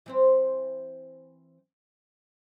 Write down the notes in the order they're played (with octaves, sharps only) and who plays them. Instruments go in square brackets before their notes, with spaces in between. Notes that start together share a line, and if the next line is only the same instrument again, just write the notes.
[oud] E3 C4 C5